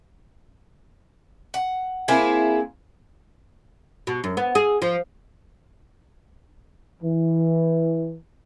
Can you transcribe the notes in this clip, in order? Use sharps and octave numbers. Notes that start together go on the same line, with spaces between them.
F#5
A#3 C4 E4 G#4
B2
F#2
B3
G#4
F3
E3